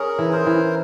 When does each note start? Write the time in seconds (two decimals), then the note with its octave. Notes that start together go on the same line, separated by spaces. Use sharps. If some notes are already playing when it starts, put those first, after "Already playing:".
Already playing: C#4 G#4 A#4
0.19 E3
0.32 A#4 C5
0.46 E3